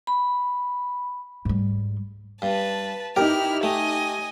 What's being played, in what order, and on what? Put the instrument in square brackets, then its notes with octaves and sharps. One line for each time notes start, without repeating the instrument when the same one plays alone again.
[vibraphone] B5
[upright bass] G#2 G3
[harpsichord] G2 [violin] B4 A5
[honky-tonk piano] D#4 G4 [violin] E4 F6 [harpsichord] A#4
[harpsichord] A3 [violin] D#5 G#5